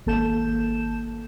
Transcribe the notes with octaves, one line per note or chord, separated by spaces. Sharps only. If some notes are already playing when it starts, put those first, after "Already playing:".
G#1 A#3 A4 A5 G6 E7